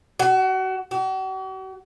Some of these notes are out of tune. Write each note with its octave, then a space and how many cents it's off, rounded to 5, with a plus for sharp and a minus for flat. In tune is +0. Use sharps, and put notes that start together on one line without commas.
F#4 +30
F#4 +45